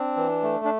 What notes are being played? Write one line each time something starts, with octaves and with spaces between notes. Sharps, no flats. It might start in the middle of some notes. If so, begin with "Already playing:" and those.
Already playing: C4 D4
E3
A3
D4